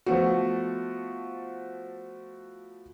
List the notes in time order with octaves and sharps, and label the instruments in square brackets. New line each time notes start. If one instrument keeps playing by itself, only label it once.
[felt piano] F3 A3 B3 F#4